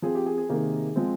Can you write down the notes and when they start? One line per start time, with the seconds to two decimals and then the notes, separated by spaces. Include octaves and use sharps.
0.02 F3 C4 G#4
0.15 G4
0.26 G#4
0.38 G#4
0.49 C3 D#3 A#3
0.96 F3 G#3 C4